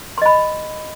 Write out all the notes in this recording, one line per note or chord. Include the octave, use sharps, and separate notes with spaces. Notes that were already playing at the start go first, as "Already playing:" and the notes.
D#5 B5 C6